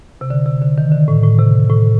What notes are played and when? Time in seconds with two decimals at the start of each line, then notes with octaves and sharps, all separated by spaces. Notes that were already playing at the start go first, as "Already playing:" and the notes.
0.21 C3
0.30 D3
0.46 C3
0.62 D3
0.78 D#3
0.92 D3
1.08 A2
1.23 A2
1.39 C3
1.70 A2